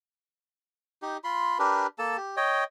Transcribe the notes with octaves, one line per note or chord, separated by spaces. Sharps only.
D#4 G4
F4 B5 C6
D4 G4 A#4 B4
A#3 A4 A5
G4
C#5 D#5 G5